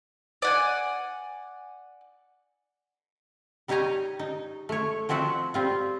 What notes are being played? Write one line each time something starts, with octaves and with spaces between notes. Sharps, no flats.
D5 F#5 G#5
G3 D#4 G4 C#5 G#5 A#5
D#4
A3 C#5
F3 C4 F#4 E5 F#5
G3 C4 F4